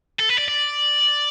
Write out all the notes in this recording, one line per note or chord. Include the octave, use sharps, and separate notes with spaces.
A4
B4
D5
D5